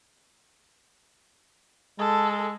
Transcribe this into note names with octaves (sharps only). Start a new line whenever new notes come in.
G#3 A4